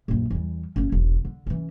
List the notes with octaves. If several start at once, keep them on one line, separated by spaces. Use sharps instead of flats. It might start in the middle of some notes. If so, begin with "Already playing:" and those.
A#1 F#2
E2 G3
F#1 C#4
E1 B1
D3
E3 C#4